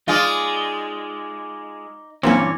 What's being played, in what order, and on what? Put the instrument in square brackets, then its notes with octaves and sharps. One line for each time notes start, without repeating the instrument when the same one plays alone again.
[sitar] G#3 F4 [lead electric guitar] D#4 D5
[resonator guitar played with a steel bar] G2 A#2 C#4 [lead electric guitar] E3 [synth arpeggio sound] F#3 A#3 C4